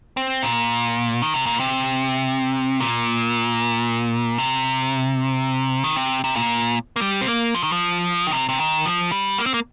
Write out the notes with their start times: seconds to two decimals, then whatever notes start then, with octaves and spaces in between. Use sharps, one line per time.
0.17 C4
0.43 A#2
1.22 D#3
1.34 C3
1.46 A#2
1.60 C3
2.80 A#2
4.38 C3
5.84 D#3
5.96 C3
6.24 C3
6.36 A#2
6.96 A#3
7.01 G3
7.21 C4
7.28 A#3
7.54 F3
7.63 D#3
7.72 F3
8.27 D#3
8.33 C3
8.49 C3
8.60 D#3
8.86 F3
9.12 G3
9.38 A#3
9.46 C4
9.54 A#3